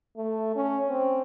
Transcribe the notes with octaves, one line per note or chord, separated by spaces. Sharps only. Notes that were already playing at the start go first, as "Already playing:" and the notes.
A3
C#4
C4